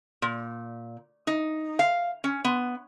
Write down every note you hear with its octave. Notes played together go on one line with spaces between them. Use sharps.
A#2
D#4
F5
C#4
B3